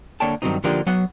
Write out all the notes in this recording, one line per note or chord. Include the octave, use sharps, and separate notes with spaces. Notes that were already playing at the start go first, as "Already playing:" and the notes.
D3 A#3 C#5 D5 G5 A5
G2 D#3 F3 F#3 C4 D#4
D3 F3 A#3 D4 D#4 G4
F#3 B3 F#5